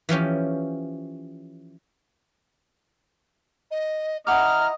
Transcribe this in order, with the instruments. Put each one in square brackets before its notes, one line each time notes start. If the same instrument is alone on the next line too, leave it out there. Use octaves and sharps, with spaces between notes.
[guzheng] E3 F3 C#4 G4
[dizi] D#5
[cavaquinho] E4 F#5 D6 [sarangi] D#5 [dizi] A#5 [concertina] F6